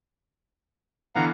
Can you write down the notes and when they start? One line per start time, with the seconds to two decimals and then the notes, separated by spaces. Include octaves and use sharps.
1.15 D3 E3 B3 F5 F#5 A#5